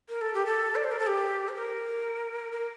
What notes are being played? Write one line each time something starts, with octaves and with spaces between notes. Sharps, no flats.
A#4
A4
G4
A4
D5
C5
A#4
A4
G4
C5
A#4
A#4